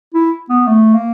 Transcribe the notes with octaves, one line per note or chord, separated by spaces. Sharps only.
E4
B3
A3
A#3